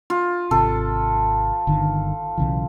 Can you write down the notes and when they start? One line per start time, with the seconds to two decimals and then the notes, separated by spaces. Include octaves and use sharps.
0.10 F4
0.51 G#1 C3 A4
1.67 G1 D3 D#3
2.37 B1 C#3 E3